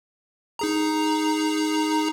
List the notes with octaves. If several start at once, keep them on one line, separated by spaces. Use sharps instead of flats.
D#4 G#4 A#5